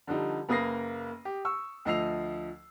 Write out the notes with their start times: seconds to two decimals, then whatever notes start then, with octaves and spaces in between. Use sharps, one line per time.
0.07 D3 F3 G3 D#4
0.49 F#1 A#3 B4 D#6 A#6 C7
1.25 G4
1.45 C#6 E6
1.85 D2 F3 D#5 E6 C7 F7